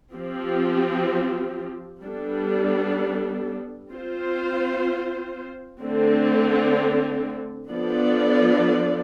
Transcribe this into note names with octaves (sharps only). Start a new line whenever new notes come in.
F3 C4 G4
G3 B3 D4 A4
C4 F4 C5
D3 A3 C4
F3 B3 D4 A4 D5